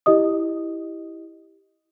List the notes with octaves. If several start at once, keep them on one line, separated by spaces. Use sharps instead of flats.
E4 G4 D#5 D#6